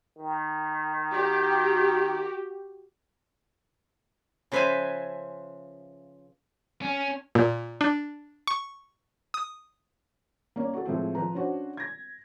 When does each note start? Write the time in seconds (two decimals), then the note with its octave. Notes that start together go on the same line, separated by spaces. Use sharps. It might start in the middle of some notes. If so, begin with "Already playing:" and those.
0.18 D#3
1.11 F#4 G4
4.52 C#3 F3 B4 C5 E5 G#5
6.82 C#4
7.35 A#2
7.81 D4
8.47 C#6
9.34 D#6
10.56 A#3 C#4 D5
10.74 F#4 A4
10.85 A2 F3 G#3 C4
11.15 F3 B4 A#5
11.35 C#4 D4 F#4 C5
11.77 G#6 A#6